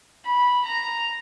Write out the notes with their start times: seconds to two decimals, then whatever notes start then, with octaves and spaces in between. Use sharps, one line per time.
0.25 B5
0.65 A#5